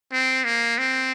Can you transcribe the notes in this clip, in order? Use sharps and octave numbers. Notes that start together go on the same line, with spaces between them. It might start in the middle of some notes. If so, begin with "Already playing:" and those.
C4
A#3
C4